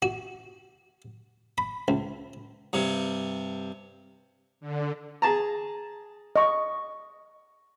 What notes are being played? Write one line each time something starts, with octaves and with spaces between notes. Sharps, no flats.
F#4
B5
C#2
G2 C3
D3
G#4 A5 A#5
D#5 C#6